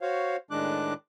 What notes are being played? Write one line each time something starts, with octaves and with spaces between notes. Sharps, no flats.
F#4 C5 C#5 F5
A2 D#3 G#3 D4 D6 F#6